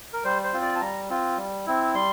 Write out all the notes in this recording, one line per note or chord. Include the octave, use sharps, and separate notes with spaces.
A#4
G3 C5
C5
C4 F4
D5
A5
G3 A#5
C4 F4
G3
C4 E4
G3 C6